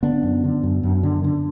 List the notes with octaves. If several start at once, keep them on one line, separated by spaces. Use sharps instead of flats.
D3 B3 D4
F#2
D3
F#2
F#2
D3
D3